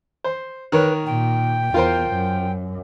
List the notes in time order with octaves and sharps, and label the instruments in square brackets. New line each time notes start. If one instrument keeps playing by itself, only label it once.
[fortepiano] C5
[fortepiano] D#3 A#4 C#5 [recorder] B4
[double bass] A#2 [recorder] G5
[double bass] E2 [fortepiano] F4 A#4 C5
[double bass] F#2